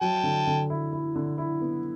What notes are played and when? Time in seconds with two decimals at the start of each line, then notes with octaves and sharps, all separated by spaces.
0.01 F#3 G5 A5
0.23 D3
0.47 D3
0.70 E4
0.93 E4
1.15 D3
1.38 E4
1.61 B3